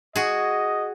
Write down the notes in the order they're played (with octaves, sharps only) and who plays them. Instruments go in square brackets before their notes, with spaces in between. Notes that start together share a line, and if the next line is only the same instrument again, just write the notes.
[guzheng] F#4 G#4 [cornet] D#5